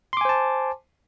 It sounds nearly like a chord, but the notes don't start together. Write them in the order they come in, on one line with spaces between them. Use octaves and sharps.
C6 D6 G#5 C5 A5